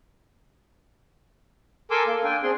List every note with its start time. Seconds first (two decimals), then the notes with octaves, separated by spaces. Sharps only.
1.91 A4 A#4 G#5 C6 D6 E6
2.07 A#3
2.24 D4 G5 G#5
2.43 C4 D4 G#4 C6